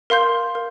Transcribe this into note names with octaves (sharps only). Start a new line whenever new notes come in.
A#4 F5 C6 G6
A#4